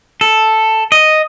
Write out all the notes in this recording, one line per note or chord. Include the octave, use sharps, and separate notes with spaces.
A4
D#5